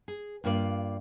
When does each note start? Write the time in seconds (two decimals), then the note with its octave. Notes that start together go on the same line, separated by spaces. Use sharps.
0.08 G#4
0.44 G2 A#3 F4 A#4 D5